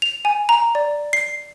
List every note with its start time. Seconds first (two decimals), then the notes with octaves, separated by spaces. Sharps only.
0.02 F7
0.25 G#5
0.49 A#5
0.75 D5
1.13 C7